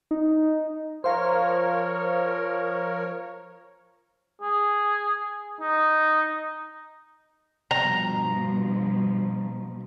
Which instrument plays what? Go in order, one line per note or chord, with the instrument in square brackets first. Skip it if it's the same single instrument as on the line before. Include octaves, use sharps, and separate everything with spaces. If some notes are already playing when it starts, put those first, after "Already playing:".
[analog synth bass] D#4
[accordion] F3 A#4 C#5 [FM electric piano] C5 F5 A#5
[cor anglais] G#4
D#4
[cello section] G2 B2 F3 [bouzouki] A#5